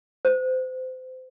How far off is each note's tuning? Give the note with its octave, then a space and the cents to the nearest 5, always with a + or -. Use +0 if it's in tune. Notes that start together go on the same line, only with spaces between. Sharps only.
C5 -30